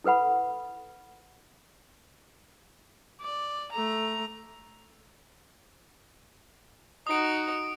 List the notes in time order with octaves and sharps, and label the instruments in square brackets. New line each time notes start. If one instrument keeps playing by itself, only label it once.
[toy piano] E4 A4 B4 F#5 B5
[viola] D5
A3 A#5
[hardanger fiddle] D#4 F#4 [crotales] D#6 D7